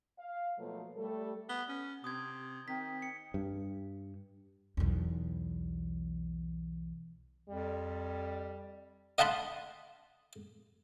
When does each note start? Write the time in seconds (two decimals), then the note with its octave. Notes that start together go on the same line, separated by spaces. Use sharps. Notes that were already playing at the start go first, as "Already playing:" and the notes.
0.19 F5
0.58 B2 F3 F#3 A3 A#3
0.97 G3 A3 A4
1.49 B3 G7
1.68 C#4
2.04 C3 D#6 G#6
2.68 D#3 C4 B6
3.02 C#7
3.34 G2
4.77 B1 E2
7.49 F2 G3
9.18 D#5 F5 F#5 A5 B5 C6